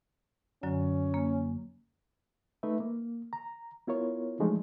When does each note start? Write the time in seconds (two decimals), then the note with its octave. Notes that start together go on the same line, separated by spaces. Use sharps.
0.63 F#2 D3 F#3 C#4
1.14 A#3
2.63 A3 D#4 B4 E5
2.80 A#3
3.33 A#5
3.87 B3 E4 F4 A#4 C#5
4.40 E3 F3 G#3 A3 D4 D#4